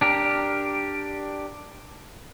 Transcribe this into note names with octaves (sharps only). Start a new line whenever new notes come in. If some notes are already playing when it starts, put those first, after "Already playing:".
D4 G4 A#4